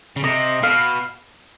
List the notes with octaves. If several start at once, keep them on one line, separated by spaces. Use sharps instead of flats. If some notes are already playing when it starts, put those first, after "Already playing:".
C#3
C3 D#5
B2 F5